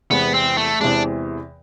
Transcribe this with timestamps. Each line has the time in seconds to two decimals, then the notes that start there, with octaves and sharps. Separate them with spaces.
0.10 E2 C3 E3 G#3 B3
0.34 C4
0.57 A3
0.81 E2 C3 E3 G#3 D4